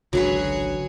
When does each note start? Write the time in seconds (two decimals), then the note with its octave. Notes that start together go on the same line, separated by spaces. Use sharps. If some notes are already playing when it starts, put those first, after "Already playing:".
0.13 G#1 C#2 D3 F#3 F#4 G#4 B4 C#5